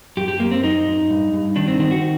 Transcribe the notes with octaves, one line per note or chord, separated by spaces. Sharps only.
F#2 G4
G4
F#2 A#3
C4
F#2 D#4
F#2
G2
G2
D#3 D4
C4
D#3 C4
F#4